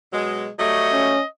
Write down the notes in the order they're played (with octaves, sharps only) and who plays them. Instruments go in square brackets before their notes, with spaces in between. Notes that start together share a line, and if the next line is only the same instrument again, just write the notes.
[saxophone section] B2 F#3 G#3
[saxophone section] F#3 G3 A3 [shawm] D#5
[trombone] C#4